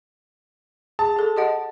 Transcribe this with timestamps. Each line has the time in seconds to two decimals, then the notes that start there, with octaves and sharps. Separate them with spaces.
0.99 G#4 A5
1.16 G#4 A4
1.37 G4 D#5 F#5